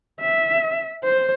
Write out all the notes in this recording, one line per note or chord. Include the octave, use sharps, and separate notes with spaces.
E5
C5